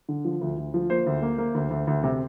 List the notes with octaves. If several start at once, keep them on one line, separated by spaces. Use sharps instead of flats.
D3
F3
D2
D2
F3
A#3 C5
D2
A#3
A#3
D2
D2
D2
C3